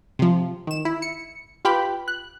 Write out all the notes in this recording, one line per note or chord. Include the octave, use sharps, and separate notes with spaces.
C3 F3
D#3 E7
E4
C#7
F4 G4 B4 G5 B5
F#6